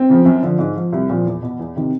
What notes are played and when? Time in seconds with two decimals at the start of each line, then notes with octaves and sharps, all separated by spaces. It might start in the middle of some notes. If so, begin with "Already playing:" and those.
Already playing: C4
0.09 C#3 F3
0.25 F#2
0.43 D3 F3
0.59 G#2
0.76 F3
0.92 C2
1.10 A#2 F3
1.26 E2
1.42 B2
1.59 E2
1.76 C3 D#3